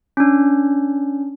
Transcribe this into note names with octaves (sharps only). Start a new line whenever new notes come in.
C#4 D4